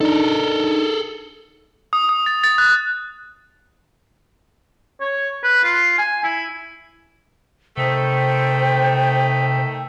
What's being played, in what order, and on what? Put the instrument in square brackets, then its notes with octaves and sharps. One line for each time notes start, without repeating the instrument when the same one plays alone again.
[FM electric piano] D4 D#4 [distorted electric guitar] A4 A#4
[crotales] D#6
D#6
A6
A6
F#6
[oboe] C#5
B4
F4
G#5
E4
[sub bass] C3 [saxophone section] D#3 A3 [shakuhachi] C5 [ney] G5